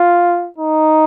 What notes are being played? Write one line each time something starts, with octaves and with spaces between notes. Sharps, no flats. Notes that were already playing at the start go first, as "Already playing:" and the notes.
Already playing: F4
D#4